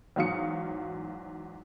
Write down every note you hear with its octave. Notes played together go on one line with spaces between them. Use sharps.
E2 G#2 F#3 F5 D#6 C#7